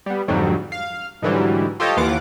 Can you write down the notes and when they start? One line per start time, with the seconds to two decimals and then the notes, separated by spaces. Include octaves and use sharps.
0.06 G3 B3
0.28 F2 G#2 D3 F#3 G3
0.72 F5
1.22 G#2 D3 E3 F#3 G3
1.80 F4 G4 A4 C5 C#5 D#5
1.97 D#2 E3 F4 F#5 D6